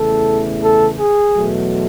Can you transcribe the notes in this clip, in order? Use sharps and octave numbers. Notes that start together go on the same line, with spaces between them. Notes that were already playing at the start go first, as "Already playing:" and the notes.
Already playing: E2 C#3 E3 A3 A4
A4
G#4
E2 B2 F#3 A3